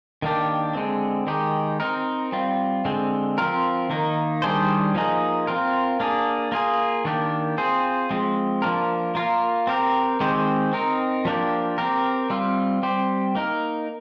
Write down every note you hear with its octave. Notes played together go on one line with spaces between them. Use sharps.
D#3 A#3 D4 G4
D3 G#3 C4
D#3 G#3 D#4 G4
C4 D#4 A#4
G3 C4 F4
D3 G#3 C4
F3 C4 F4 A#4
D#3 A#3 D#4
D#3 G3 D4 G#4 C5
F3 A#3 D#4 G#4
C4 F4 A#4
A#3 D4 G#4
A#3 F4 G#4
D#3 A#3 D4 G4
C4 F4 G#4 C5
F3 G#3 C4
F3 A#3 D4 F4 A#4
A#3 F4 A#4
C4 G4 A#4
D#3 G#3 C4 G4 C5
C4 D#4 A#4
F3 A#3 D4 G4
C4 G4 A#4
G3 C4 F4
G3 C4 G4 C5
A#3 D#4 A#4